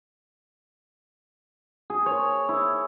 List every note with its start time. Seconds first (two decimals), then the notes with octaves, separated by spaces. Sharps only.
1.90 G#4
2.06 C#5
2.49 E4